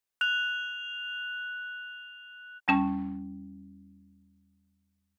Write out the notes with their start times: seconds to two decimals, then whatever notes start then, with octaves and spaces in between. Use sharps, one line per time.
0.21 F#6 F7
2.68 E2 G3 C#4 A5